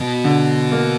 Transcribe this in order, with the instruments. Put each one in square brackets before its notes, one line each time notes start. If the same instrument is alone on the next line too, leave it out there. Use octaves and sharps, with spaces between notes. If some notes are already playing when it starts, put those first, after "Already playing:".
Already playing: [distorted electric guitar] B2
[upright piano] D3
A#3